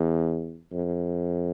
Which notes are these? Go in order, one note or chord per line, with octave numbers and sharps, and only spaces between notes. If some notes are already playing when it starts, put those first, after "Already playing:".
Already playing: E2
F2